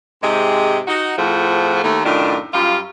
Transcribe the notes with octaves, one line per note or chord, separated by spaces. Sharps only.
G#2 C3 G#3 G4 G#4
D#4 F#4
F2 A2 F3 G#4 F#5
D#2 A3
F#2 A2 D#3 D4 F4
F#2 G3 F4